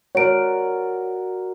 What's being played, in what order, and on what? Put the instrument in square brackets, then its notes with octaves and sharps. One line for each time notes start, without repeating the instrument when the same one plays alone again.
[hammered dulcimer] F#4 A#4 D5 [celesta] C#5 D7